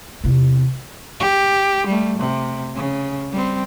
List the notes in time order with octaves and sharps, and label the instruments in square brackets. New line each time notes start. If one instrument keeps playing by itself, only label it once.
[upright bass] E2 C3
[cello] G4
G3 A3
C3
C#3
G3 C4